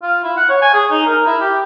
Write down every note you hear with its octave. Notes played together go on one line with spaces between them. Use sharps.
F4
E4
F#5
C#5
G#5
G#4
D#4
A#4
E4
G4